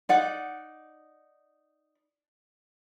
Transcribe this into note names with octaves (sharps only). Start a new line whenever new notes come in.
D#4 D5 F#5